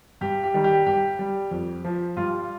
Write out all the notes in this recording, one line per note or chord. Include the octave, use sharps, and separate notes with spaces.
G2 G4
G4
D#3 G3
G4
G2 G4
G3
F2
F3
G2 F4